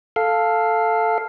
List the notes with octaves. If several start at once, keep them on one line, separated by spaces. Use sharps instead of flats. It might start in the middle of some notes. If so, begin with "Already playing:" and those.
A4 F5